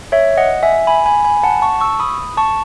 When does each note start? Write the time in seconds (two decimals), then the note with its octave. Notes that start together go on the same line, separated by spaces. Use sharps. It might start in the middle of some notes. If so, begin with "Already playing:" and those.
0.12 C#5 E5
0.37 D#5 F#5
0.63 E5 G#5
0.87 G#5 B5
1.06 G#5 B5
1.25 G#5 B5
1.43 F#5 A5
1.62 A5 C#6
1.81 C#6 E6
2.00 B5 D#6
2.37 A5 C#6